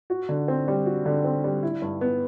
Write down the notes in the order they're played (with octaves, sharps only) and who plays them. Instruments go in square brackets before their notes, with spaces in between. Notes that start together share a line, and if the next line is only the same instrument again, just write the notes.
[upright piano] F#4
D3
C4
G3
F#4
D3
C4
G3
E4
G2
B3